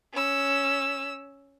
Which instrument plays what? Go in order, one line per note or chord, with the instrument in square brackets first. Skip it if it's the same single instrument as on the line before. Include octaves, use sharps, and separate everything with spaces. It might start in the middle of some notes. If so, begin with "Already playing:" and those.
[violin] C#4 E6